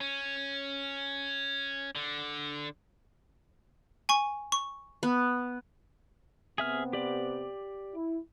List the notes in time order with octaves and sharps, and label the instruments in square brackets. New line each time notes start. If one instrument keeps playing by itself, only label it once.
[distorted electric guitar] C#4
D3
[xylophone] G#5 C#6
C#6
[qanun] B3
[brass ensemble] C3 B3 C4 [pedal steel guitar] G#4 E5 F6
[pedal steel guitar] G4 D5
[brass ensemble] E4